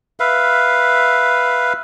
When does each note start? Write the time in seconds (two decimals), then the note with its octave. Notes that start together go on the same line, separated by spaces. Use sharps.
0.20 B4 E5 F5